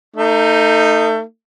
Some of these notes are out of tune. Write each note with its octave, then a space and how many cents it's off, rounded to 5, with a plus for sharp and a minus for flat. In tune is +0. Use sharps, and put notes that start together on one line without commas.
A3 +30 D#4 +0